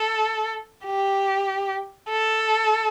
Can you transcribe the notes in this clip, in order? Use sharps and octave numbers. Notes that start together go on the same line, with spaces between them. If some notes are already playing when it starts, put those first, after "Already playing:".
Already playing: A4
G4
A4